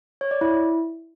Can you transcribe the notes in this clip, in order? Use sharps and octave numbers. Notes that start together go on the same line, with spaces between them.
C#5
D5
E4